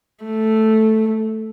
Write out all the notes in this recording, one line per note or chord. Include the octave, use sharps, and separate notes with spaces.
A3